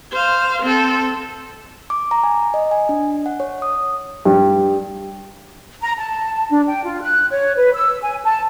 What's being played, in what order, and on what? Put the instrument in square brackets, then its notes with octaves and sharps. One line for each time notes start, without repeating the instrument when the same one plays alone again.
[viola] C5 F5
C4 A4
[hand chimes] D6
A#5
G#5
D#5
G#5
D4
F#5
C#5
D#6
[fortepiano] G2
[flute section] A#5
A5
D4
G5
F4
F#6
C#5
B4
E6
G#5
A5